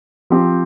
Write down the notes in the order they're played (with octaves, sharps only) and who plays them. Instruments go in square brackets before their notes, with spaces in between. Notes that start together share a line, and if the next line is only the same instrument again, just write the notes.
[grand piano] F3 C4 G4